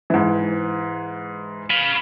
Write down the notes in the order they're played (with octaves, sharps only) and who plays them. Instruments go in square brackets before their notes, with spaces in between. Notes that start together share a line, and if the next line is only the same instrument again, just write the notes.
[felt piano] G#2 E3
[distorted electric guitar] F5 B5